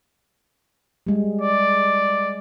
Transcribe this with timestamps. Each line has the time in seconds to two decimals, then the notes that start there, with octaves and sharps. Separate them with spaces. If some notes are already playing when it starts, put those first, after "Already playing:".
1.07 G3 G#3
1.41 D5